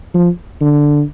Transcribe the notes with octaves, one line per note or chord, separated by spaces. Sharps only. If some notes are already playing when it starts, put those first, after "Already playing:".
F3
D3